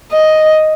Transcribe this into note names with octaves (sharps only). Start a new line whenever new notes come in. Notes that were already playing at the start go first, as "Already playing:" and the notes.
D#5